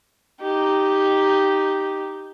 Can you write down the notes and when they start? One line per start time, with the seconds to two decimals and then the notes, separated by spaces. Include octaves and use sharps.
0.42 D#4 G4